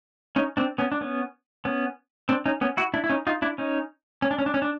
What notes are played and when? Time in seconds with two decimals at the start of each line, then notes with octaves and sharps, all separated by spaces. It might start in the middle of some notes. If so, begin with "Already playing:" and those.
0.36 C#4 D#4
0.57 C4 D4
0.78 B3 C#4
0.92 D4
1.01 B3 C#4
1.65 B3 C#4
2.29 C4 D4
2.46 C#4 D#4
2.61 B3 C#4
2.77 E4 F#4
2.94 D4 E4
3.04 E4
3.09 C#4 D#4
3.27 D#4 F4
3.42 D4 E4
3.58 C#4 D#4
4.22 C#4
4.31 D4
4.39 C#4
4.46 D4
4.54 C#4
4.62 D4